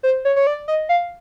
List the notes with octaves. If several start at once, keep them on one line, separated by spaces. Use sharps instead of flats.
C5
C#5
C#5
D5
D#5
F5